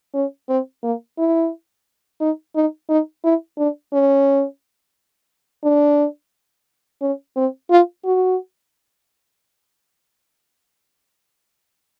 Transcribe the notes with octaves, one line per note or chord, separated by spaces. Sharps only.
C#4
C4
A#3
E4
D#4
D#4
D#4
E4
D4
C#4
D4
C#4
C4
F4
F#4